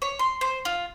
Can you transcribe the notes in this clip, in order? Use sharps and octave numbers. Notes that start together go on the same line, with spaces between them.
C#5
C6
C5
F4